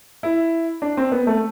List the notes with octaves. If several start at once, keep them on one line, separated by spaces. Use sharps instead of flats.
E4
D4
C4
B3
A3